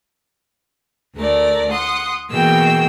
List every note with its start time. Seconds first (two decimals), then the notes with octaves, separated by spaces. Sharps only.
1.15 D2 A3 A#4 D5
1.68 F#5 C6 D#6
2.30 B2 E3 A#3 G#4 G5 E6